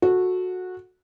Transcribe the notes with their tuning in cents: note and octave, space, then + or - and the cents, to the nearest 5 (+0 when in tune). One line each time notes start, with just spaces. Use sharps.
F#4 -15 A4 +0